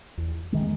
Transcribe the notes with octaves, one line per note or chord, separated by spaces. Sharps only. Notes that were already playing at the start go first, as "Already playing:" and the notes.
E2
D#3 G#3